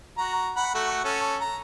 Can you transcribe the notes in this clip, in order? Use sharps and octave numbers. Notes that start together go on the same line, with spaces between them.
F#4 A#5
F#5 B5
A3 F#4 F#5
C#4 A4
A#5